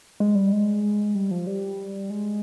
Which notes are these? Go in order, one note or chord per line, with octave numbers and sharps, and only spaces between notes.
G#3
G3
G#3
G3
F3
G3
G#3